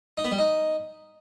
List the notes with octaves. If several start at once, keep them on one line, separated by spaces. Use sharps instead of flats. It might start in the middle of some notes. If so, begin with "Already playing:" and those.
D#4
B3
G3
D#4